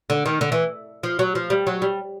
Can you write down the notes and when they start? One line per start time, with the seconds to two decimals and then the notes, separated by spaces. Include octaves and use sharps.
0.10 D3
0.26 D#3
0.41 D3
0.52 E3
1.03 F3
1.19 F#3
1.35 F3
1.50 G3
1.67 F#3
1.82 G3